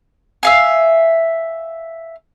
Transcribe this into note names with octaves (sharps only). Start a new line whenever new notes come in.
E5 F5 G#5